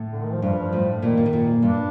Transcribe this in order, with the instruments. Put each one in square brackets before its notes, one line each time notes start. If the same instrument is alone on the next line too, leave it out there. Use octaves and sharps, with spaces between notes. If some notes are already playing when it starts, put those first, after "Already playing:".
Already playing: [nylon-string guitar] A2
[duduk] D3
D#3
F3
[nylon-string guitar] G2 [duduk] F3
[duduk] F3
[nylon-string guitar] A2
[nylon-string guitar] A#2 [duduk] D#3
[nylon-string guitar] A#2
A2
A#2
[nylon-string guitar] G2 [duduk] D4